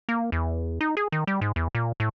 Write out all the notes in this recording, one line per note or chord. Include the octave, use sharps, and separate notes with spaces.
A#3
E2
D#4
G#4
D#3
G3
G#2
E2
A#2
A2